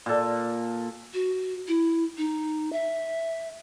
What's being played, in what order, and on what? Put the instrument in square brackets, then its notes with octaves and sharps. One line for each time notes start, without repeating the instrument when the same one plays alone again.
[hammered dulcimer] A#2 A4
[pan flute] F#4
E4
D#4
E5